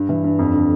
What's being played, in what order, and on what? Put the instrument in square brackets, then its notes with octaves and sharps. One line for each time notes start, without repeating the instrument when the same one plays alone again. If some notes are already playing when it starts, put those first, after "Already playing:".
Already playing: [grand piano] G2
E3
G2
F2
D3